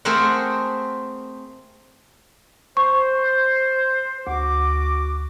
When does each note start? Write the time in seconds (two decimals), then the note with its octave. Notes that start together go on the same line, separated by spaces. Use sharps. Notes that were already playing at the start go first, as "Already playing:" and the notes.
0.05 A3 C4 G#4 A#4 C5 F#5
2.77 C5 C#6
4.27 D2 F#4 D6